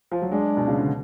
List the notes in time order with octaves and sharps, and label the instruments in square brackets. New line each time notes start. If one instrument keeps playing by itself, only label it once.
[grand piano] F3
F#3
[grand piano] G#3 [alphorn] D4
[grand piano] B2
C#3
D3